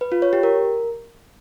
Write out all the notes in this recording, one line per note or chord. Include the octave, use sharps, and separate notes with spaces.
B4
F4
C#5
G4
A#4